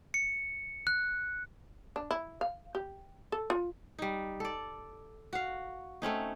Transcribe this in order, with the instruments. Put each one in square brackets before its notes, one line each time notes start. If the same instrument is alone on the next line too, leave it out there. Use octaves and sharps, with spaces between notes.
[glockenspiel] C#7
F#6
[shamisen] D4
E4
F5
G4
A4
F4
[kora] G3 D#4
A4 D5
F#4 F5
A3 C4 C#4 D#4